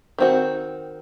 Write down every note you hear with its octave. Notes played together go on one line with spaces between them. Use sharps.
D#3 C4 F#4